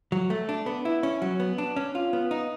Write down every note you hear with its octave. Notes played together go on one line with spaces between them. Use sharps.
F#3
A3
D4
B3
E4
C#4
F#3
B3
D4
C#4
F4
B3
D#4